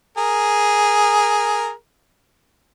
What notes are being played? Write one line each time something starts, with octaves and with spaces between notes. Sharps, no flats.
G#4 A#4